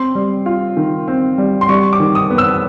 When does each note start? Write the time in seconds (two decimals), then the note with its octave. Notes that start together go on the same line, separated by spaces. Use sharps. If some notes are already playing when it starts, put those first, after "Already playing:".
Already playing: C4 C6
0.15 G3
0.46 F4
0.77 D#3
1.08 C4
1.38 G3
1.61 C6
1.69 G3 C#6
1.93 D6
2.00 D#3
2.15 D#6
2.30 B3
2.38 E6